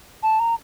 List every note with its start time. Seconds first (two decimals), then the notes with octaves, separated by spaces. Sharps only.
0.23 A5
0.39 A#5